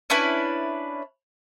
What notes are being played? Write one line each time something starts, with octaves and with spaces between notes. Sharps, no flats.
C#4 D4 E4 B4